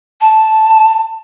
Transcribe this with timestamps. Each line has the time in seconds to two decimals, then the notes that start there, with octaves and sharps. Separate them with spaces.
0.21 A5